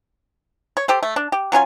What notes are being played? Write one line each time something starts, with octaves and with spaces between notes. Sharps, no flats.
C#5
G4 A4 C5
A3
D4
G4
F#3 C#4 F4 G#5